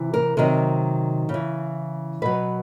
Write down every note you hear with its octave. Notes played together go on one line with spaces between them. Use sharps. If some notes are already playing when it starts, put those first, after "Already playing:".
Already playing: C3 E3
A#4
C3 D#3 F#3 A#4
C#3
E3
B2 F#3 B4